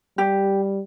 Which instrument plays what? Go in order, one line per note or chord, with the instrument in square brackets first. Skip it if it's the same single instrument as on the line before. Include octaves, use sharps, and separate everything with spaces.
[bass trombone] G3 [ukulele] G4